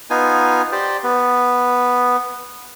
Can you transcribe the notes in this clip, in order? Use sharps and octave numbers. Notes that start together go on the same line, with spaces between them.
B3 D#4 F4 G#5
G4 C5 D5
B3